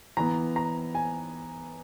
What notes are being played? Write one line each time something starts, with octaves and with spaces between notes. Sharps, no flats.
E3 B3 A#5
A#5
G#5